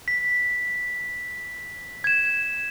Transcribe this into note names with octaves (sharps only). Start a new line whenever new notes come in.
B6
G#6 E7